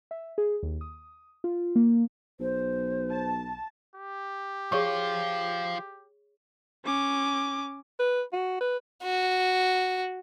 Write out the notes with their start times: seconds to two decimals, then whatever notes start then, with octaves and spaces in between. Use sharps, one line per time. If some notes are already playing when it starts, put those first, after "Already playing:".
0.11 E5
0.38 G#4
0.63 D#2
0.81 D#6
1.44 F4
1.76 A#3
2.40 B1 C5
3.11 A5
3.96 G4
4.72 F3 F4 G#4 C#5 C#6
6.85 C#4 D6
7.99 B4
8.33 F#4
8.61 B4
9.03 F#4